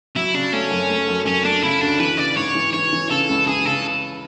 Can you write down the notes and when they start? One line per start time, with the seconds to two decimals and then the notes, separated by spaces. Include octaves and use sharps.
0.16 F#3 E4
0.34 C#3 D4
0.53 A3 C#4
0.71 F#2
0.90 A3
1.08 F#2
1.26 F#2 C#4
1.44 A3 D4
1.63 C#3 E4
1.81 D2 D4
1.99 E3 B4
2.18 C#3 D5
2.37 G#2 C#5
2.55 E3
2.73 E3 C#5
2.93 E3
3.10 C#3 A4
3.29 C#2
3.47 E3 G#4
3.65 C#3 A4